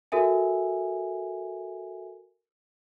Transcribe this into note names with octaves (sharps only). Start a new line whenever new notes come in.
F#4 A4 A#4 E5 G#5